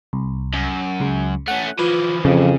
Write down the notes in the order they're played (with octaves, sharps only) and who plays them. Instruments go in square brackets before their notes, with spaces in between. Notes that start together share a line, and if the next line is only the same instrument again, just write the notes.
[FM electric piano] C2
[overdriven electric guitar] F#2
[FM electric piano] C#2 C#3
[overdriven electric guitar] A3 C#4 [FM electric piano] F#5
[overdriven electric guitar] E3 F3 [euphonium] F4 [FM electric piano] B4
[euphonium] F2 [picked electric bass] C#3